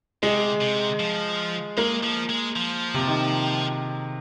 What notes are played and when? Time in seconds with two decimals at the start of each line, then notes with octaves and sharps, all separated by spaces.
0.23 C3 G#3
0.61 C3
1.00 F3
1.78 G#3 A#3
2.03 F3
2.30 G#3
2.56 F3
2.94 C3
3.07 D#3